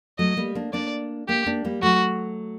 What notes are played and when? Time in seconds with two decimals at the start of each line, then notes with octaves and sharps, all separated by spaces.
0.18 F#3 A3 D#5
0.37 G3 A#3
0.55 A#3 D4
0.73 A#3 D4 D5
1.28 A#3 D4 G4
1.46 A#3 D4
1.65 G3 A#3
1.83 F#3 A3 F#4